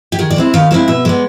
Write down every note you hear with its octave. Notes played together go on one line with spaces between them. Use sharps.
G4
D#3 G#4
D5
G#3 C4 E4
D#3 F5
G#3 C4 E4 F5
B2 E5
G#3 B3 D5